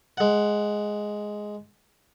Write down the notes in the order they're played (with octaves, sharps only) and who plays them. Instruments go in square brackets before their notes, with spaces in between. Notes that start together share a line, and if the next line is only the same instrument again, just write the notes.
[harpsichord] G#3 F#5